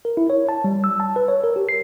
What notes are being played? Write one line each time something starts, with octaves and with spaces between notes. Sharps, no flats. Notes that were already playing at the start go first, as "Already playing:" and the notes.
A#4
E4
C#5
A5
G3
E6
A5
B4
C#5
A#4
G4
C7